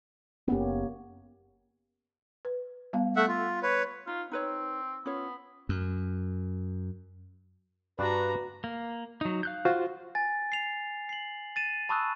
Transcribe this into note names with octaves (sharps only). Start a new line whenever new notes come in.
F#1 A#3 B3 C#4 G4
B4
G3 B3 F5
A3 E5 F#5
F4
B4 C#5
D#4 F4
C4 D#4 B4 C#5
B3 C#4 F4 C#5
F#2
G2 D4 F#4 B4 A#5
A#3
F#3 D#4
F5 F#6 G6
F4 F#4 C5
G#5 A6
C7 F7
C7 F#7
A6 D#7 E7
A5 B5 C#6 D#6 E6 F#6